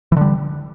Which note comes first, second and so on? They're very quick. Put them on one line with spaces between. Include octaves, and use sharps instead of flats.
E3 D3 G3